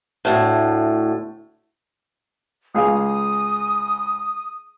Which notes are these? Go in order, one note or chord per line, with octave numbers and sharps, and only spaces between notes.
D2 A2
C#2 G#4 F5 D#6